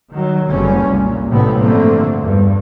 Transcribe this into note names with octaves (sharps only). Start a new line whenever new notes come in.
D#3 F#3
F#1 F#2 D3 G3 C#4
C2 A#2
A1 A2 C3 G3 A3 B3
G2 D3 F3 A3 A#3 C4
E2 G2